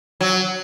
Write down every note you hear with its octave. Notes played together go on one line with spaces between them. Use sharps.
F#3